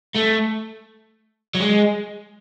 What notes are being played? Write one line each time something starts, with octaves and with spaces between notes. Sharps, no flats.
A3
F#3
G#3